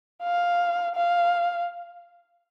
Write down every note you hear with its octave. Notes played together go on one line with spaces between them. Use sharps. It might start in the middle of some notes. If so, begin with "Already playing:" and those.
F5
F5